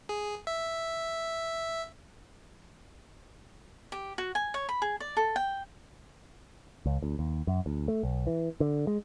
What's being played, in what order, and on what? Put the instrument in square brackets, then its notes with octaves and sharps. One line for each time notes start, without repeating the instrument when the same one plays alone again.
[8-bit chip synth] G#4
E5
[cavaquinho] G4
F#4
G#5
C#5
B5
G#4
D5
A4
G5
[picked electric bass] C#2
D2
D#2
F#2
D2
A3
B1
E3
D3
G#3